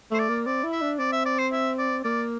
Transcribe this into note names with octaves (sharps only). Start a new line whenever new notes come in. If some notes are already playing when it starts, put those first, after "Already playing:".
A3 C5
D5
A#3
C4 D5
E4
E5
D4
C4 D5
E5
D5
C5
E5
D5
A#3 D5